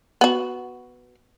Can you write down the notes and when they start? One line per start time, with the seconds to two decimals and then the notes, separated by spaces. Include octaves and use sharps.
0.21 B3 F#4